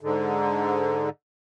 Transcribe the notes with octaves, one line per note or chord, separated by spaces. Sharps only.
G#2 D3